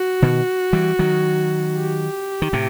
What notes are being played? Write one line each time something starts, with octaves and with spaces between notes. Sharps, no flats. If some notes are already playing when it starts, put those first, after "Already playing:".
Already playing: F#4
B2 D#3
E3 G3
D#3 F#3
G4
D#3
A2 C3